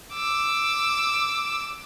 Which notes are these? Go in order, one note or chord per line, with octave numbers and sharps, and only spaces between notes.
D6 E6